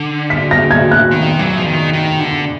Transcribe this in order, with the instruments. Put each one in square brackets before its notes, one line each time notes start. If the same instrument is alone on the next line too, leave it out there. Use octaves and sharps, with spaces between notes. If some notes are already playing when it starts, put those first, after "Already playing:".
Already playing: [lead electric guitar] D3
[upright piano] B6
A#6
G#6
F#6
[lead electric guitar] D#3
F#3
F3
D#3
D#3
D3